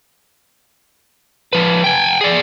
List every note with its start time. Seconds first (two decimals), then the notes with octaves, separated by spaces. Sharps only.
1.53 F3 B4
1.84 G5 G#5
2.21 G#4 D5